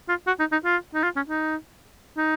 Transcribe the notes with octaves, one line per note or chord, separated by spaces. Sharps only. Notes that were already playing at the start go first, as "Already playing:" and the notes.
F4
F#4
D#4
D#4
F4
D#4
F4
C#4
D#4
D#4